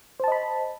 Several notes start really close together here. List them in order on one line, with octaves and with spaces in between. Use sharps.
C5 A5 D#5 B5